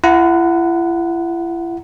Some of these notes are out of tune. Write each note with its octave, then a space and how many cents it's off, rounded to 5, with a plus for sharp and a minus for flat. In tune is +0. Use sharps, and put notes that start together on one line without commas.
E4 +40 F#5 +0 A#5 +0